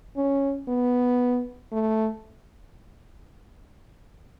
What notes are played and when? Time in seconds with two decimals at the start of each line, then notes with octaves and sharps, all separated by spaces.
0.16 C#4
0.68 B3
1.72 A3